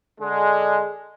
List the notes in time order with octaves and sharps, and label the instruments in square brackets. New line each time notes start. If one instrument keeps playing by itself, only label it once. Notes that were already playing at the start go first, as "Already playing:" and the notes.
[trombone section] D3 G#3